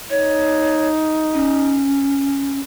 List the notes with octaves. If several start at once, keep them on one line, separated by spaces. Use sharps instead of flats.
D#4 C#5
C#4